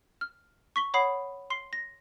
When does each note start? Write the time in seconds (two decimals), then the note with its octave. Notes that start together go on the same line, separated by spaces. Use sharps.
0.21 F6
0.76 C#6 B6 G7
0.94 C#5 F#5 B5 D#6 C7
1.50 C6 C7 G7
1.73 A#6